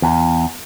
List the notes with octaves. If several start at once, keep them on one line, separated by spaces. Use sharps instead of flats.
E2